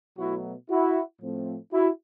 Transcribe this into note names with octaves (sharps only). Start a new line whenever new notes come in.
B2 F#3 A3 E4 F#4
E4 F#4
A2 F3 A3 C4
E4 F#4